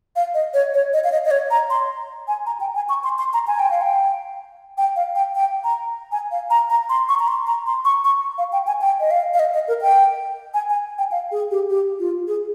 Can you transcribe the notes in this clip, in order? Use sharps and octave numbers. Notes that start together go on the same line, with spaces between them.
F5
D#5
C#5
C#5
D#5
F5
D#5
D#5
C#5
A#5
C6
G#5
A#5
G5
G#5
C#6
C6
C6
A#5
G#5
G5
F5
G5
G5
F5
G5
G5
A#5
G#5
F5
A#5
A#5
C6
C#6
A#5
C6
A#5
C6
C#6
C#6
F5
G5
G#5
G5
D#5
F5
F5
D#5
D#5
A#4
G5
G#5
G#5
G5
F5
G#4
G4
G4
F4
G#4